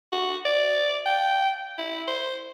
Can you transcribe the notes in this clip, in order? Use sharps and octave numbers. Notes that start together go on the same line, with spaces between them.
F#4
D5
G5
E4
C5